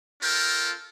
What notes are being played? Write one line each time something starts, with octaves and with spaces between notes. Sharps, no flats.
C#4 F4 A4 A#4 G5